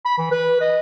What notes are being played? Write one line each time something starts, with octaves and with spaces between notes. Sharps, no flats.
B5
E3
B4
D#5